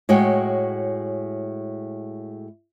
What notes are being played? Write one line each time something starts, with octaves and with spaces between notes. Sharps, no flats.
A2 G#3 F#4 C#5 G5